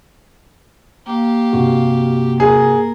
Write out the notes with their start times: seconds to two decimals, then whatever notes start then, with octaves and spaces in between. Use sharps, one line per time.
1.06 A#3 G4 F5
1.53 G2 C3 F#4
2.40 G#4 A#4